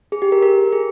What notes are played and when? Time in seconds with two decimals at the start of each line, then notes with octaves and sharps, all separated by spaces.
0.12 G#4
0.22 G4
0.32 A#4
0.42 A#4
0.73 G#4